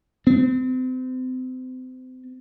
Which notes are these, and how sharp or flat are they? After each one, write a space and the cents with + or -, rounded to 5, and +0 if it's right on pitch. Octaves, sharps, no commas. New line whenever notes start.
C4 -35